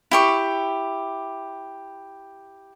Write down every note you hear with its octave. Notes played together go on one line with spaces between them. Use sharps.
E4 G4 C#6